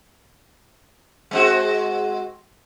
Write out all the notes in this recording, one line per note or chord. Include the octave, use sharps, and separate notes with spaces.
G#3 C4 F#4